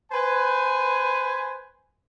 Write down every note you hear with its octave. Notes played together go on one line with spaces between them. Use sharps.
B4 C5 G#5